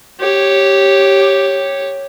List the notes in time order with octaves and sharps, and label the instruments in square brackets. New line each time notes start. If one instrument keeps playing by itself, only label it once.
[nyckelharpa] G4 C#5